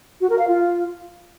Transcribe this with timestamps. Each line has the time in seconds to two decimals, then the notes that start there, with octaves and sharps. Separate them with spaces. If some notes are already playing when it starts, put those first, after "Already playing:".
0.21 F#4
0.30 A#4
0.39 F5
0.48 F4